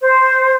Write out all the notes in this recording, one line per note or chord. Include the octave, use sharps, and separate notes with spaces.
C5